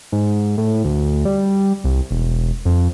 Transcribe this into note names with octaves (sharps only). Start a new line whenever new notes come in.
G#2
A2
D2
G3
C2
E1
F2